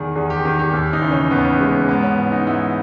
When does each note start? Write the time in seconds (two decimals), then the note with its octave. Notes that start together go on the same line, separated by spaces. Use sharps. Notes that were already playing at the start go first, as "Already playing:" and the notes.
Already playing: E2 D#3 G#4
0.15 E2 G#4
0.30 G4
0.45 D#3
0.59 G4
0.73 D#2
0.93 D#4
1.02 C#3 E3
1.12 C#4
1.31 D#2 B3
1.60 C#3 E3 G#3
1.89 G#2 B3
2.03 C#4
2.18 E3
2.32 D#4
2.47 G#2 E4